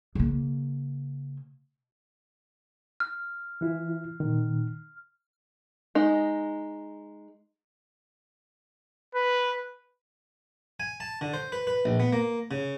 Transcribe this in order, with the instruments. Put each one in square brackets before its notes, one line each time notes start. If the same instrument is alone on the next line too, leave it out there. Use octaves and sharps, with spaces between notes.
[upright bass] C#3 A#3
[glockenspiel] F6
[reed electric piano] E3 E4 F4
A#2 D#3
[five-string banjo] G#3 D#4
[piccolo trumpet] B4
[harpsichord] G#5
A5
D3
C5
B4
B4
A#1
B3
A#3
C#3